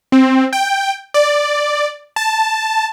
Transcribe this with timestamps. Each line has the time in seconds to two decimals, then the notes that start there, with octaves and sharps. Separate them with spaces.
0.12 C4
0.53 G5
1.14 D5
2.16 A5